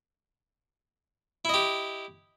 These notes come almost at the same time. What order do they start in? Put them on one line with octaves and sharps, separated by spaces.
E4 D#5 G4